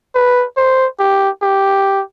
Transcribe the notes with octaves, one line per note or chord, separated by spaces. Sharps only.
B4
C5
G4
G4